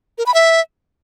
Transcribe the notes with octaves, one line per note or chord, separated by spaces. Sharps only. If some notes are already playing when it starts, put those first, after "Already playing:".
A#4
B5
E5